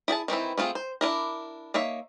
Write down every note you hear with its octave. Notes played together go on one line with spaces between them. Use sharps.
E4 G#4 G#5 A5
D#3 E3 C4 E4
A3 C4 F4 G#4
C5
D4 E4 A#4
A#3 D#4 C#5 E5